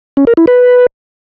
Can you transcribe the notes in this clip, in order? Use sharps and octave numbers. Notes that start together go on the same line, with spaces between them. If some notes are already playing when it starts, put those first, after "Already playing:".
C#4
A#4
E4
B4